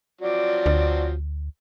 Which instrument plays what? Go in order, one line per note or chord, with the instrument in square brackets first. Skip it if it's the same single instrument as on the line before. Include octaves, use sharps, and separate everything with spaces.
[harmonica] F3 F#3 C4 [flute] D5
[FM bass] D2